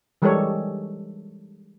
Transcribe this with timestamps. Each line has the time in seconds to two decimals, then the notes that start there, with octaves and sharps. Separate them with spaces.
0.22 E3 G3 G#3 A4 A#4 C#5